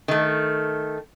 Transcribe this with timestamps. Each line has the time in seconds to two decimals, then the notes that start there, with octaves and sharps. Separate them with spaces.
0.08 D#3 A3